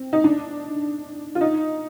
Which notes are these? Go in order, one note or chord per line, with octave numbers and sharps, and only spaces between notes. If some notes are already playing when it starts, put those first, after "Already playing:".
Already playing: C4
D#4
D4
F4
D#4